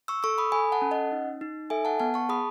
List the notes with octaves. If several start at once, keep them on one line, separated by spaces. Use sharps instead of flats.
C#6 E6
A4 C#6 E6
B5 D#6
A4 G#5 B5
F#5 A5
C#4
D#5 F#5
D#4
D#4
A4 E5 G#5
F#5 A5
B3 F#5 A5
A5 C#6
G#4 B5 D#6